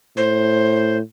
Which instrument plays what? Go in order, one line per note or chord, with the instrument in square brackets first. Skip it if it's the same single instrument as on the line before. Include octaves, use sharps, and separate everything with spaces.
[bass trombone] A2 [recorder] C5